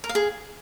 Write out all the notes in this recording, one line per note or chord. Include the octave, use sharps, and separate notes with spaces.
A#4
F5
G#4